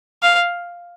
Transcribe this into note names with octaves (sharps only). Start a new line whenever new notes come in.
F5